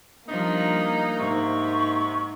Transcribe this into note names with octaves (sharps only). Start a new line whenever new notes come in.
F3 G3 A#3 D4 D#4
G#2 C3 C#6